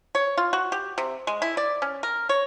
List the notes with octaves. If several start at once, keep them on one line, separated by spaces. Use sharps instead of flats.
C#5
F4
F#4
G4
C3
G#3
E4
D5
C#4
A#4
C#5